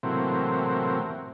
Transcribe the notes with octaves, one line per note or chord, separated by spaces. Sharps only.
A2 C3 E3 F#3 A#3 C4